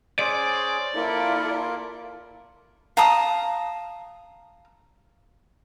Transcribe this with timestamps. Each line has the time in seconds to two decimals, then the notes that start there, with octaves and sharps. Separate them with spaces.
0.19 C#4 G#4 C5 D5
0.96 A#3 E4 F4 A4 A#4
2.97 F5 A5 A#5 D#6